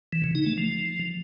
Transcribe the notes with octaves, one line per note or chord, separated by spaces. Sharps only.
E3
C#3
D#4
A3
F3